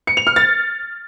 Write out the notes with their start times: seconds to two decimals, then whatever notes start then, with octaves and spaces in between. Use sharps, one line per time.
0.07 C#7
0.17 F7
0.27 F6
0.36 A6